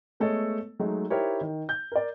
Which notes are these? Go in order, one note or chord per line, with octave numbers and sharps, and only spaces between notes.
G#3 A3 B3 A4 C#5 D#5
F#3 G#3 A3 D#4
D#4 E4 G4 A#4 C5 C#5
D#3
G6
A#4 D5